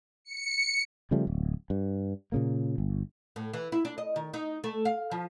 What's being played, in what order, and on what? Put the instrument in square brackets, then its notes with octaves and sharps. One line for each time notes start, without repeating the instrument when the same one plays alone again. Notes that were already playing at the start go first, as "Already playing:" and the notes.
[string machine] C#7
[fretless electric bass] C#3 F3 G3 A3
D1
G2
A#2 C#3 A#3
G1
[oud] A2
E3
E4
D4
D#5
D#3
D#4
A3
F5
F3